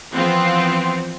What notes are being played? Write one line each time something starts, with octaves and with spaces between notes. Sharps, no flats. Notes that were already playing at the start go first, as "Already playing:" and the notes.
E3 F3 B3 C4 F4